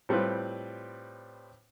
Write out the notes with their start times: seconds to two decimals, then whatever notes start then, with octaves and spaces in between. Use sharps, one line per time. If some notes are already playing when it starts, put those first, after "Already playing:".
0.09 A2 G3 C4 F4 B4